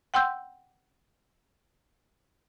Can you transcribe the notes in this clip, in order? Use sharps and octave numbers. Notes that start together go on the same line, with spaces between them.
F#5 G5 C6 E6 G6